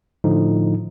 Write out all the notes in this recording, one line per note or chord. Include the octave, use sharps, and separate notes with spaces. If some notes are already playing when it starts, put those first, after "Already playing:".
A2 D3 F3 D#4